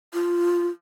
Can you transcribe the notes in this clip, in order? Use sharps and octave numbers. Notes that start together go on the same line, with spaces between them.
F4